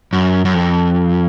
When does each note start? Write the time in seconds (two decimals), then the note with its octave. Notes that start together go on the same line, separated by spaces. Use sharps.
0.13 F#2
0.45 F#2
0.54 F2